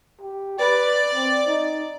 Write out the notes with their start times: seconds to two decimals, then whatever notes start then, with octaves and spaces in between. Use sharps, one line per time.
0.22 G4
0.59 B4 D5
1.15 C4
1.47 D#4